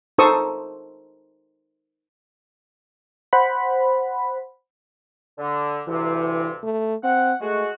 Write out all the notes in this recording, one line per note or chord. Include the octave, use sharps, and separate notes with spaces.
D#4 A4 C5 C#6 D#6 E6
C5 F#5 B5
D3
D2 G2 C3 E3
A3
C4 F#5
G#3 A3 F#4